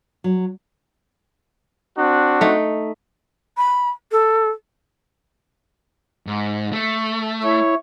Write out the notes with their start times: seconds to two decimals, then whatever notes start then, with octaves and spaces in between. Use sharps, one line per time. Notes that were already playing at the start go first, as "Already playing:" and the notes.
0.24 F#3
1.97 C4 D4 F#4
2.41 A3 D#4
3.57 B5
4.12 A4
6.27 G#2
6.72 A3
7.43 E4 C#5